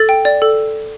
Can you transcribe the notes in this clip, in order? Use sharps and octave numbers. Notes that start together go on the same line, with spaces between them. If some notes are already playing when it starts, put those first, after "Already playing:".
Already playing: A4 A6
G5
D5
A4